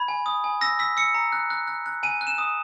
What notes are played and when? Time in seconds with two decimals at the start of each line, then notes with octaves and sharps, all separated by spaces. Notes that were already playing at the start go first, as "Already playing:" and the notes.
Already playing: B5 G#6
0.08 G#5
0.26 D#6
0.44 G#5
0.61 E6 A#6
0.79 E6 B6
0.97 E6 C#7
1.14 A#5
1.32 F#6
1.50 F#6
1.68 F#6
1.86 F#6
2.03 G#5 D#7
2.21 F#6
2.27 E7
2.38 D#6